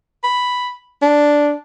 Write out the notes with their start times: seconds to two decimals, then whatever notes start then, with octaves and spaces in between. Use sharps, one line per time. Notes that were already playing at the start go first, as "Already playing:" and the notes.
0.24 B5
1.02 D4